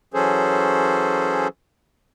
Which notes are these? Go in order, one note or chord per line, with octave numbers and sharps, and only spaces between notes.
E3 F#3 C#4 G#4 A4 C5